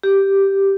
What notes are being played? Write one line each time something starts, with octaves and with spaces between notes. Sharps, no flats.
G4